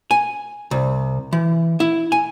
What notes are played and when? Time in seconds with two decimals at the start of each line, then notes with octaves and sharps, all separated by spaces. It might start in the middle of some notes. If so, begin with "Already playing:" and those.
0.11 G#5
0.71 C2
1.33 E3
1.80 E4
2.12 G#5